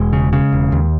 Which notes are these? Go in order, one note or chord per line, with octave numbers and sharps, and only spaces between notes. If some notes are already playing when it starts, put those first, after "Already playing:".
Already playing: E1 G#3
C#3
C#3
E1
D#2